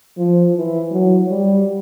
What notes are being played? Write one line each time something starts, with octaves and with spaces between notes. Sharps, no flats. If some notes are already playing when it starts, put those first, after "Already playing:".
F3
E3
F#3
G3